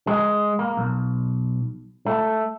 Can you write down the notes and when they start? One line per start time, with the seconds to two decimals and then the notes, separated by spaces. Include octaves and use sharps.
0.07 G#3
0.59 A#3
0.77 B1
2.06 A3